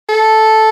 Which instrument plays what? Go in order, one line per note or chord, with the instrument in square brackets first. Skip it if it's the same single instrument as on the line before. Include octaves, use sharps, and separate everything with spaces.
[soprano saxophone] A4